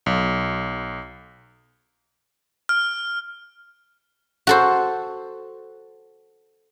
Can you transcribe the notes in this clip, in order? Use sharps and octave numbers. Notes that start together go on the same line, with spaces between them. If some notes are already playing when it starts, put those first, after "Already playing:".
B1
F6
F#4 A4 C5